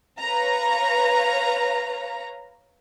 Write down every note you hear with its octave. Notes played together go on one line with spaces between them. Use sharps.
B4 C#5 F5 A#5